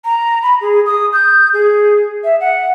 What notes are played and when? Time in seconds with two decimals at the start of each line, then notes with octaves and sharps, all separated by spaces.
0.05 A#5
0.43 B5
0.61 G#4
0.86 D#6
1.13 G6
1.54 G#4
2.24 E5
2.40 F#5